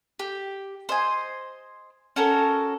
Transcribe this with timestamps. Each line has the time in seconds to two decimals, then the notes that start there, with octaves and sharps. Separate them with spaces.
0.19 G4
0.89 C5 D#5 G#5
2.16 C#4 F#4 A4 A#4